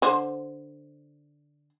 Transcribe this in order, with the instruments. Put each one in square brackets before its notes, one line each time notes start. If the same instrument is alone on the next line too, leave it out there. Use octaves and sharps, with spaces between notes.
[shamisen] D3 C5